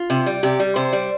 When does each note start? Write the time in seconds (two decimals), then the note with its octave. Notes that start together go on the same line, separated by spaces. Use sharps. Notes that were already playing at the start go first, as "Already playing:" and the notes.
Already playing: F4
0.10 C3
0.26 G3
0.43 C3 G4
0.60 G3
0.76 C3 C5
0.93 G3